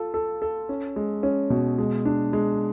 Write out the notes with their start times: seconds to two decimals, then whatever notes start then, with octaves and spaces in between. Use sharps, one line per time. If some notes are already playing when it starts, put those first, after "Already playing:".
Already playing: F4 A4
0.14 A4
0.42 A4
0.69 C#4
0.96 G#3
1.23 C#4
1.50 B2
1.78 G#3
2.06 D4
2.33 G#3